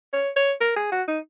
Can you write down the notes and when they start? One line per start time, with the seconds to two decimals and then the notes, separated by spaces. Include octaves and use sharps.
0.13 C#5
0.36 C#5
0.61 A#4
0.76 G#4
0.92 F#4
1.08 D#4